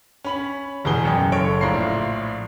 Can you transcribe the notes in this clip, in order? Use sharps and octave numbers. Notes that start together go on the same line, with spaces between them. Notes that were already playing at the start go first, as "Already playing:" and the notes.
C#4 B5 F#7
E1 E2 B2 G#4 G7
A1 F#2 G5
F#1 A4 C#5 D7
A#1 A2 F4 A#5 C6 C7